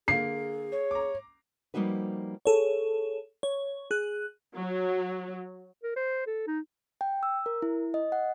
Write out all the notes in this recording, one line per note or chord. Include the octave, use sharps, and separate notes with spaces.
D3 A#3 G#4 C7
C#5
A#5 D6
F3 G3 A#3 D#4 F#4 B4
G#4 A4 C#5
C#5
G#4 F#6
F#3
A#4
C5
A4
D#4
G5
E6
A#4
E4
D#5
F#5